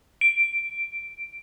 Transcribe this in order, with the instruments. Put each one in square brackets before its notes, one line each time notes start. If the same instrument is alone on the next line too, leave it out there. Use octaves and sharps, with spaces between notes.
[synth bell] D7